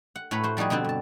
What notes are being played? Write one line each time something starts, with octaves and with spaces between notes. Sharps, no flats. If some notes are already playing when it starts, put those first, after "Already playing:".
F#5
A2 A3 B4 C#5 A#5 B5
F#4 C5 F#5
F3 G3 D#4 F#4 G#4
B2 D3 B3 C4
G2 A5